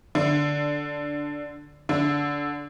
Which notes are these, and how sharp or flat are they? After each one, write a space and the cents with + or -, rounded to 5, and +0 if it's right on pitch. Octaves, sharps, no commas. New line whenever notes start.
D3 +0
D3 -15